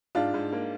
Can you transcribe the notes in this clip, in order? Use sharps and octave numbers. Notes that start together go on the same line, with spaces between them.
G#2 D4 F4
G#2
A#3